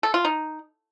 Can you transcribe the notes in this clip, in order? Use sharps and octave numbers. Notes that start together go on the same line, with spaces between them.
A4
F4
D#4